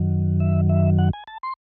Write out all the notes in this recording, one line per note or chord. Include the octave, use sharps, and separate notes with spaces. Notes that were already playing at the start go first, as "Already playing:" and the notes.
Already playing: F#2 D#3 F#3
E5
E5
F#5
G#5
A5
C6